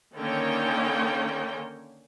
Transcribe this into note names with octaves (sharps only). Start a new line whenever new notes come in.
D3 D#3 A#3 C#4 C#5 G5